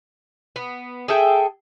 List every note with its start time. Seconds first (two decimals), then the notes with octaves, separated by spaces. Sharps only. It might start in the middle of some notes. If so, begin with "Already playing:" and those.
0.56 B3
1.08 G#4 A4 E5 G5